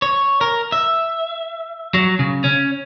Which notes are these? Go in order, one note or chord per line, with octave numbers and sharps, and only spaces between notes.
C#5
A#4
E5
F#3
C#3
C#4